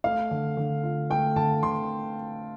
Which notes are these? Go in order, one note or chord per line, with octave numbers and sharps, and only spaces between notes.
A3 F5
D3
D3
F4
A3 G5
D3 A5
D3 C6